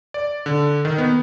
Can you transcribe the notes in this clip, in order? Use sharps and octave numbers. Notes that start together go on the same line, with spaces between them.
D5
D3
D#3
B3